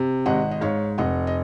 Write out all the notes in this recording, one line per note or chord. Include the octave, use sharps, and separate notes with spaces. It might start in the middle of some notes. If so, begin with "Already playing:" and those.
Already playing: C3
G#1 D#5 F#5
D#5
G#2 C#5 F5
F1 D#5 F#5
D#5